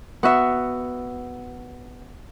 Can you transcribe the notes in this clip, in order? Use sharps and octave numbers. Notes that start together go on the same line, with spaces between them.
B3 F#4 E5